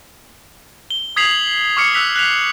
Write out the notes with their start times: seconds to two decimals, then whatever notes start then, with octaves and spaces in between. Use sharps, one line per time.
0.90 G7
1.16 D#6 G#6 B6 C7 F7 F#7
1.77 C#6 D6 F6 C7 C#7
1.94 E6 F#6 B6 F7
2.16 F#6 B6 F7